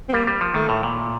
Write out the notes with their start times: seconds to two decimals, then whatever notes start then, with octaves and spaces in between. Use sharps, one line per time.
0.09 C4
0.13 G3 A#3
0.27 G3
0.41 F3
0.54 D#3 A3
0.69 A2
0.83 A#2